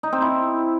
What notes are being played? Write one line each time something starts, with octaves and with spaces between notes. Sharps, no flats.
D#4
C4
E4